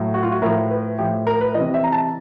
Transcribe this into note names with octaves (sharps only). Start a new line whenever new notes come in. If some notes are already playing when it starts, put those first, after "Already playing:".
Already playing: A2 F#3
F#4
F4
F#4
A2 F3 A#4
B4
A2 F3 G4
A#4
B4
C3 E3 D#5
E5
A#5
A5